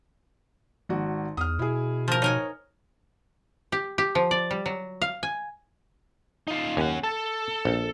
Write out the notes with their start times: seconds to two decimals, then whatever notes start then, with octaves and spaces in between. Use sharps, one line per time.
0.89 G#1 F#4
1.37 E2 D#6 F6
1.59 B2 E4 G#4
2.08 F3 A#4
2.22 D#4 A#4 C#5 G#5
3.72 G4
3.98 G4
4.15 F3
4.31 D5
4.51 G3
4.66 F#3
5.02 F5
5.23 G#5
6.48 D#4 F4
6.77 D#2 C#4 F#5
7.04 A4 A5
7.65 A#1